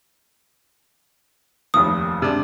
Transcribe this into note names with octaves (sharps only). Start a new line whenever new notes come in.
F1 D#2 D#6
C3 G#3 D4